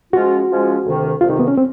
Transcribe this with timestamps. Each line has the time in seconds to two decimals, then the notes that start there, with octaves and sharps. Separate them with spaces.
0.13 F3 G#3 C#4 F4 F#4
0.50 F3 G#3 C#4 F4
0.85 D2 C3 D#3
1.21 D2 C3 D#3 F4
1.30 D#4
1.39 B3
1.48 C#4
1.57 C4